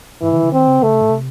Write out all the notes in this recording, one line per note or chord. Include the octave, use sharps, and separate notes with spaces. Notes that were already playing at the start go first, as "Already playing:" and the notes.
G#2 E3
C3
D#3
C#3
D#3 C4
C#3
C#3 A3
C3
A2
C3